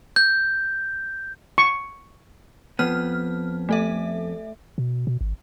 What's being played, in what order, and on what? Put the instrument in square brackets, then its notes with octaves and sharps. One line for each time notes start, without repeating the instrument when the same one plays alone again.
[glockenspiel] G6
[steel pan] C#6
[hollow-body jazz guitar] F2 B3 [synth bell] F6
[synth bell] A3 A4 E5
[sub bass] B2
B2
G#1